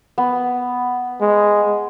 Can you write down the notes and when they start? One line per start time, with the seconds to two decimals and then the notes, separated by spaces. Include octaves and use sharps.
0.18 B3
1.21 G#3